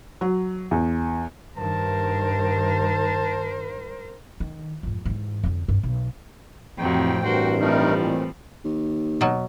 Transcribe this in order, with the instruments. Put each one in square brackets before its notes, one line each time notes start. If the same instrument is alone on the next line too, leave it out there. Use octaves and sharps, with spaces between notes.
[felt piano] F#3
E2
[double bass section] G2 D#3 [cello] A#4 C5 [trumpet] A5
[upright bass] D#3
F2 G#2
G#2 E3
F2 D3
G2 C4
B1
[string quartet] F2 C3 F#3 [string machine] A2 E3 C4 [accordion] G5
[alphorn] G2 [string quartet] F#4 A#4 C5
[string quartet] F3 G3 [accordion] A3 D#4 A#4
[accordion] A#2 D#3
[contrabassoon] D#2
[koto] B2 F#3